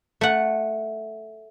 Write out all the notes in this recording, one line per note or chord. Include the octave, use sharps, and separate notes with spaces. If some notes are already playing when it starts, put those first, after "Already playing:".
A3 F#5